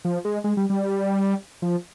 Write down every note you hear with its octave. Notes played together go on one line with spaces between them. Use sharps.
F3
G#3
G#3
G3
G3
F3